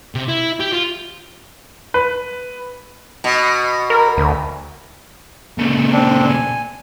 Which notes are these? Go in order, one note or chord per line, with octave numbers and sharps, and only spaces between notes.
C3
E4
G4
F4
B4
B2
A#4
D2
A#2 C#3
C4 D4
G#5